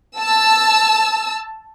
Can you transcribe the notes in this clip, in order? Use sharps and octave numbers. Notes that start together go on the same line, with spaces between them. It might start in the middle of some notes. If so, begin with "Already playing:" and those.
A5 E6